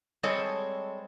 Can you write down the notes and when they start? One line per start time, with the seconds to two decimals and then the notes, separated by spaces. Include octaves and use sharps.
0.23 G3 G#3 C4 A4 C#5 D#5